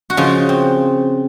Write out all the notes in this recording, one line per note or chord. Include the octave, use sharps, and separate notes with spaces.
F#4
C#3 F3 F4
C4